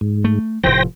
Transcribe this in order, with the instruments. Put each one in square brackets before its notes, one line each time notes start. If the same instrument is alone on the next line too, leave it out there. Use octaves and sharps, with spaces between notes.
[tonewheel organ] G#2
[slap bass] A3
[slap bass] F1 A2 F3 [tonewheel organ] C5 G5 A#6